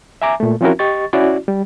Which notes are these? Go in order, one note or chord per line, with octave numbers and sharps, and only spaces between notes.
E5 G#5 A#5 D6
A#2 A3
F3 C4 C#4 E4 F#4 A#4
G4 D#5 C#6 A6
C#4 E4 F#4 D5
G3